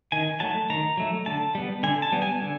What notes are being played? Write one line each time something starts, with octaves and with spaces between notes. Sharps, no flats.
D#3 G#5
F#3 A3 A5
D#3 A#5
F#3 A3
D3 A5
G3 B3
D3 G#5
A5
G3 B3
G#5
D3